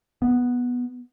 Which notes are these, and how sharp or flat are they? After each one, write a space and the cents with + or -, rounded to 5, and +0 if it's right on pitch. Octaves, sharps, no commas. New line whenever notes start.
B3 -5